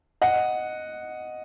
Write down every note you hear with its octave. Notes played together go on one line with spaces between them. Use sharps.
D#5 F#5